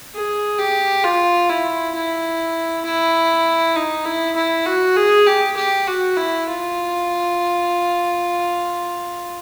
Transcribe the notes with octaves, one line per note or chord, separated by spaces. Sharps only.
G#4
G4
F4
E4
E4
E4
D#4
E4
E4
F#4
G#4
G4
G4
F#4
E4
F4